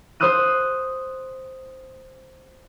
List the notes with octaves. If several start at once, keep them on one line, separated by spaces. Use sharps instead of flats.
C5 D#6 E6 F#6 D#7